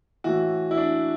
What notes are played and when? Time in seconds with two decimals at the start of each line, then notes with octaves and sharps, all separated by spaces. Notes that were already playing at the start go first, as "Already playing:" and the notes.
0.24 A2 E3 F#4
0.71 E4
0.77 D4